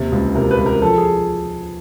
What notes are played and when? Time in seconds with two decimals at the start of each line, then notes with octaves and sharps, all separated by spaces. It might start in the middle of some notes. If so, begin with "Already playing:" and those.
Already playing: D#2 C3
0.12 C#2
0.35 C3 A#4
0.51 B4
0.58 C#2
0.66 A#4
0.82 F3 A4
0.97 G#4